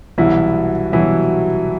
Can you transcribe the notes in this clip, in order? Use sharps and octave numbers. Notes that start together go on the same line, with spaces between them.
C2 B2 E3 F#3 E4
C2 B2 E3 F#3 E4